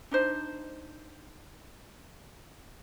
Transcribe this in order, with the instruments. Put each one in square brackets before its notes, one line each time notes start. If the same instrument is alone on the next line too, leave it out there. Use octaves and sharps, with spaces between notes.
[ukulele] D4 D#4 C5